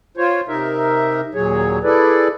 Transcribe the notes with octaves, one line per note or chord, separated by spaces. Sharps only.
F4 C5 C#5
C3 D#4 A#4 E5
D#2 A#2 F#3 G#4 C#5
E4 G#4 A4 B4 D5